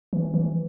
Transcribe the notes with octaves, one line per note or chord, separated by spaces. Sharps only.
E3
E3